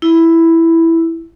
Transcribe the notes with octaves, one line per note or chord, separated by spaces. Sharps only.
E4